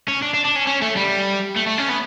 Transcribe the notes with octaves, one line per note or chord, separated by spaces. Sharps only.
C#4
D4
D4
D4
C#4
C#4
A3
G3
A3
A3
C#4
B3